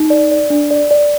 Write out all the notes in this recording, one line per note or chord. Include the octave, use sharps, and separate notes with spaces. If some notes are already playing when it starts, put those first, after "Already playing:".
Already playing: D#4
D5
D5
D4
D5
D5